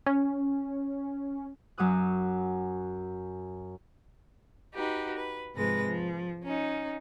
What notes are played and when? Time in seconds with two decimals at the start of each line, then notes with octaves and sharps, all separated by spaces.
0.06 C#4
1.78 F#2 F#3 D6 D#6 F#6
4.75 D#4 F#4 G4 B4
5.15 B4
5.55 G#2 C3 F3 G#3 B4 A#6
5.84 F3
6.45 C#4 D#4